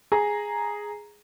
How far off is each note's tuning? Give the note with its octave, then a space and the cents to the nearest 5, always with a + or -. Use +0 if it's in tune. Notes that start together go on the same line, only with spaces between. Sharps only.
G#4 +0 A#5 +0